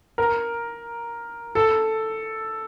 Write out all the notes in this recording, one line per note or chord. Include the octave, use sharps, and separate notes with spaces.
A#4
A4